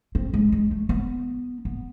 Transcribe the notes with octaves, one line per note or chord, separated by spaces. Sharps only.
C4
G#3
G#3
A3
B3
B3